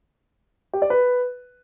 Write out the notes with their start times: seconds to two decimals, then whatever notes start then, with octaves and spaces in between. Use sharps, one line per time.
0.73 G4
0.82 D5
0.90 B4